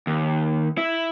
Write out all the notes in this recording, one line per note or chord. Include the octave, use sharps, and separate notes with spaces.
D#2
E4